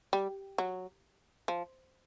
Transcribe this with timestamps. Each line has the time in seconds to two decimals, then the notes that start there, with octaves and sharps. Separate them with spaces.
0.13 G3
0.58 F#3
1.48 F3